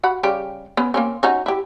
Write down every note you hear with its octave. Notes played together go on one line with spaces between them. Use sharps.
F#4 F#5 B5
C#3 G3 G4
B3 C#4
A#3 C4 C#4
C#4 D#4 F#4
E4 G4